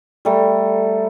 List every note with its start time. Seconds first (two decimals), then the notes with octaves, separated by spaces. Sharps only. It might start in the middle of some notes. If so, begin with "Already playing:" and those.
0.25 G3 A3 A#4